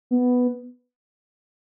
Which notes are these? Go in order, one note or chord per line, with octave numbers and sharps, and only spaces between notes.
B3